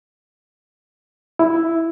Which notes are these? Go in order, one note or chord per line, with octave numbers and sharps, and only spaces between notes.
E4